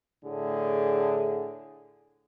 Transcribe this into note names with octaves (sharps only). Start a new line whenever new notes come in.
A2 D3 G#4